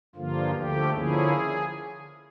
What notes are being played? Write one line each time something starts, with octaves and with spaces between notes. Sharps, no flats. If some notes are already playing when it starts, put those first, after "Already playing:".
G2 D3 F3 A#3 F4
D2 D3 F3 A3 G4
D3 F3 A#3 C#4 E4 G#4